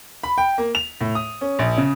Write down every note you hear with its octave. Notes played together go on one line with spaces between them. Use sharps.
B5
G5
A#3
F7
A2
D#6
C#4
A#1
C#3